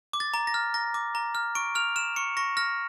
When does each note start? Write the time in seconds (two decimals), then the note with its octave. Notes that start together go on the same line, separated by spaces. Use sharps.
0.13 D6
0.20 A6
0.34 A#5
0.47 A#6
0.54 F6
0.74 A#5 A#6
0.94 D6
1.15 A#5
1.35 F6
1.55 C#6 D7
1.75 F6 F7
1.96 F6 E7
2.16 C#6 C#7
2.37 C#6 A#6
2.57 F6 A#6